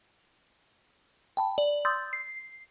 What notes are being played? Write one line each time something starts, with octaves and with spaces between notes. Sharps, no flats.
G5 A5 B5
D5
C6 D#6 E6 G6 A6
C7